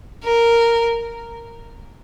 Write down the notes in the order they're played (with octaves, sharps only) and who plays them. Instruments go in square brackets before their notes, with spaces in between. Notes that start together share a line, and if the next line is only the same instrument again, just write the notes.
[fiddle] A#4